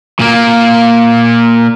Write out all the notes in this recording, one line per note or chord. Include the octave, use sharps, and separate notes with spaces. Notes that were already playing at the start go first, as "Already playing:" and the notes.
A#2 A#3